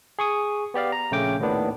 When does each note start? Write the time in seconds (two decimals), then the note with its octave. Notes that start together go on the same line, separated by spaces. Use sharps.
0.19 G#4 C#6 D#6
0.74 B3 G4 D5 F5
0.92 A#5
1.11 A#1 C#3 A3 C#4 G5 D6
1.40 D#2 A2 D#3 B3 D4